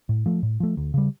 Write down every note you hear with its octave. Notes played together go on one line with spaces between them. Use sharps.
A2
F3 A3
A2
F3 A3
D2
C#3 G3